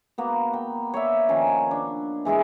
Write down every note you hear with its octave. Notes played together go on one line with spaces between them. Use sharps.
A#3 B3 F#4
G5
C#5 D5 E5
D#3 F3 C#4
D4
E3 G#3 E4 G#4